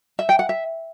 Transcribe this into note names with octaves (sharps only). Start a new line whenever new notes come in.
E5
G5
F#5
E5